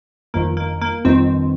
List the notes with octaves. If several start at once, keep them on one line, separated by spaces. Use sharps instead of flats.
G1 F2 D#3 A#3
A#3
A#3
G1 F2 D#3 C4